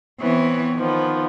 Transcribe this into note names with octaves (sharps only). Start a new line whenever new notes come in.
E3 B3 C4 C#5
D#3 F3 B3